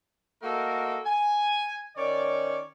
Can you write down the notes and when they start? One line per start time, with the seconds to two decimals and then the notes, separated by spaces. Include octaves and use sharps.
0.43 A3 A#3 F#4 A4 A#4 D#5
1.06 G#5
1.97 D#3 C#4 C#5 D5